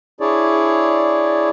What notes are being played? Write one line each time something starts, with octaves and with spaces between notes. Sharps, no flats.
D4 E4 G#4 C#5 D5